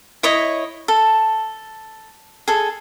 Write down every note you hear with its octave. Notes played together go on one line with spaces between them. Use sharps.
E4 C#5 D#5
A4
G#4 A4